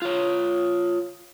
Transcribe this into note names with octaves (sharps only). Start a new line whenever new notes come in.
F4 C#5